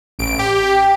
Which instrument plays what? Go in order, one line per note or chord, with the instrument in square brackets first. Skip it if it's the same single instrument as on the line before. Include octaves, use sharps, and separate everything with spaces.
[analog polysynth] A1 D7
G4
[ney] G5